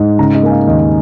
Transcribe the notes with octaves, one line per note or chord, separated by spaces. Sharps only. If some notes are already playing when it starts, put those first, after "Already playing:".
Already playing: G#2
C#3 A#5
D#5
A#3 G#5
F5
D#2 D#5